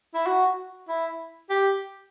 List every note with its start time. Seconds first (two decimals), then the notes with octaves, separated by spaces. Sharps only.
0.15 E4
0.26 F#4
0.89 E4
1.50 G4